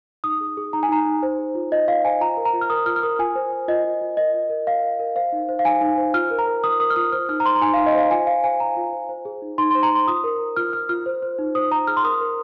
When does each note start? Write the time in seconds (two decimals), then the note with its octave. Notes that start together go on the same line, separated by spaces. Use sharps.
0.24 D#4 D#6
0.41 G#4
0.57 G#4
0.73 D#4 A#5
0.83 G#5
0.89 D#4 A#5
1.06 D#4
1.23 C5
1.39 G#4
1.55 F4
1.72 F4 D#5
1.88 F4 F5
2.05 C5 G#5
2.21 F4 A#5
2.37 A#4
2.45 A#5
2.54 F4
2.61 F6
2.70 A#4 D#6
2.86 F4 F6
2.96 F6
3.03 A#4 D#6
3.19 F4 G#5
3.36 C5
3.53 C5
3.68 F4 D#5
3.85 F4
4.01 F4
4.17 A#4 D#5
4.34 F4
4.50 A#4
4.67 A#4 F5
4.83 A#4
5.00 A#4
5.16 C5 F5
5.32 D#4
5.49 C5
5.59 F5
5.65 D#4 G#5
5.81 D#4
5.98 C5
6.14 F4 F6
6.31 A#4
6.39 A#5
6.47 A#4
6.63 A#4 D#6
6.80 A#4 D#6
6.90 F6
6.96 F4 D#6
7.12 C5 F6
7.29 D#4 F6
7.40 A#5
7.45 C5 C6
7.55 A#5
7.62 D#4 G#5
7.74 F5
7.78 D#4
7.86 D#5
7.94 C5 F5
8.11 F4 G#5
8.27 C5 F5
8.44 C5 G#5
8.60 C5 A#5
8.77 F4
8.93 C5
9.09 C5
9.25 G#4
9.42 D#4
9.58 D#4 C6
9.71 C6
9.75 C5
9.83 A#5
9.91 C5 C6
10.07 F4 D#6
10.24 A#4
10.41 A#4
10.57 F4 F6
10.73 A#4 F6
10.89 F4 F6
11.06 C5
11.23 C5
11.39 D#4
11.55 C5 D#6
11.71 C5 A#5
11.87 G#4 F6
11.97 C6
12.04 A#4 D#6
12.21 A#4